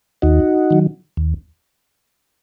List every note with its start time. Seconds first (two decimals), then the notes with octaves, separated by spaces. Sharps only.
0.22 D#2 D#4 F#4
0.70 D#3 F#3
1.17 D#2